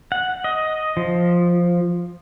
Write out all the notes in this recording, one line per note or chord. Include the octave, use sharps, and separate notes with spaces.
F#5
D#5
F3